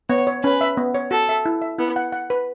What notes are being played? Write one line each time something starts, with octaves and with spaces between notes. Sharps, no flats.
B3 C#5
C#5
C#4 B4
E5
B3
C#5
F#4 A4
E5
E4
E5
B3 E4
F#5
F#5
B4